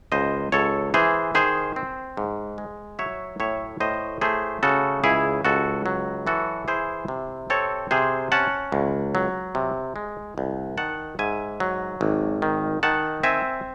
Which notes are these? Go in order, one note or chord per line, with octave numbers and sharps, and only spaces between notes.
C#2 C5 D#5
C#2 A4 C#5
E3 G#4 C5
D#3 G#4 C5
C4
G#2
G#3
F#3 C#5 E5
A2 C#5 E5
A2 C5 D#5
A3 G#4 C5
C#3 F#4 A4
C#2 E4 G#4
C#2 F#4 A4
F#3
E3 F#4 A4
E4 G#4 C5
C3
C4 A4 C#5
C3 G#4 C5
C#4 F#5 A5
C#2
F#3
C3
G#3
C2
D#3 F#5 A5
G#2 E5 G#5
F#3
G#1
D#3
D#3 F#5 A5
C4 E5 G#5